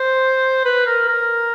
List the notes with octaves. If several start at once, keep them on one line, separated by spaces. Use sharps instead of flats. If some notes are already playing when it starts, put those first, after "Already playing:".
Already playing: C5
B4
A#4
A#4